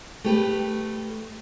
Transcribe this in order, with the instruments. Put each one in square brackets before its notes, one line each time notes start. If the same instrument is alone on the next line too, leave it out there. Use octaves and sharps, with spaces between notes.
[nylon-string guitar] A3 G4 B4